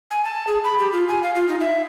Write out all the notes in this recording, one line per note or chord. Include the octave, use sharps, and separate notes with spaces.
G#5
A5
G#4
B5
G4
F4
G#5
F5
F4
D#4
E5